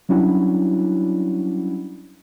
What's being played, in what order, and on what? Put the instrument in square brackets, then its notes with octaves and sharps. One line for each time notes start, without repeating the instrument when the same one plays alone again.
[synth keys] F#3 G3 C#4 D4 E4 F#4